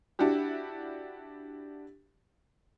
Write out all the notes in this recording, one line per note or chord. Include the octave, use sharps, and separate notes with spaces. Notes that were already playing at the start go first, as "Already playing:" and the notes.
D4 E4 F#4 G4